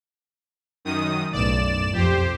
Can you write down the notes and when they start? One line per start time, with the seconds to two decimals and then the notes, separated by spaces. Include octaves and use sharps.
0.85 F#2 D#3 D#6
1.33 B1 F#2 A2 D5 E7
1.93 F2 G4 C5